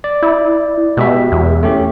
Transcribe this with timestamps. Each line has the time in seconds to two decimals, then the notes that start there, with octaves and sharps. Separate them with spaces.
0.04 D5
0.23 E4
0.97 B2 G#3 G4 E5
1.32 E2
1.63 A3 C#4 G4